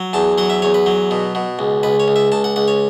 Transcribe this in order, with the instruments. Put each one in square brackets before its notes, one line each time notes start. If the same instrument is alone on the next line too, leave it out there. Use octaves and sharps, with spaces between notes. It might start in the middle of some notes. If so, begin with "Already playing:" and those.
Already playing: [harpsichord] F#3
E2 A5
F#3 F#5
E5
E2 C#5
B4
F#3
B2
B2
C#2
C#2 B4
C#5
C#2
E5
C#2 A5
F#5
C#2 F#5
C#5